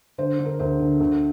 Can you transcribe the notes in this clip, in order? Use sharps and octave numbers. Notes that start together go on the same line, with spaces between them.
D3 C5
D3
A#4
D2 C5
D3
D2